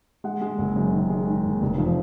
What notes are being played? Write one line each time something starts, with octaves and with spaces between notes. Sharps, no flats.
G#3 F#5
G#3
F#1
F#2
D#3
G#3
D#3
F#1
F1
F3